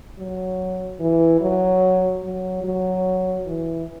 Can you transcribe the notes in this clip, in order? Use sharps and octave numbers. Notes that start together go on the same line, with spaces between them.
F#3
E3
F#3
F#3
F#3
E3